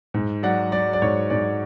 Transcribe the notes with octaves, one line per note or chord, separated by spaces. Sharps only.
G#2
F#3 D5 F#5
F#3 D5
D5
G#2 C#5
G#2 D5